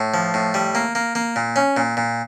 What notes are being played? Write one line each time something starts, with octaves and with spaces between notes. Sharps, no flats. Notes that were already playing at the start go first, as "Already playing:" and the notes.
Already playing: A2
F3
A2
G3
A#3
A#3
A#3
A#2
C#4
A#2
A#2